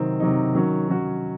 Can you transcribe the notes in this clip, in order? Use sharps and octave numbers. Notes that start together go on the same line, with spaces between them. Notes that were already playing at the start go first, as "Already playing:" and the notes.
Already playing: C3 D#3 F#3 C4 D#4
C3 D#3 F#3 C4 D#4
D#3 F#3 C#4 F#4
D#3 F#3 C#4 F#4